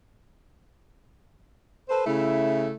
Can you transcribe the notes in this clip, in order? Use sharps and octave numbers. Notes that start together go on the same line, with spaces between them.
A4 B4 C5
C#3 A3 E4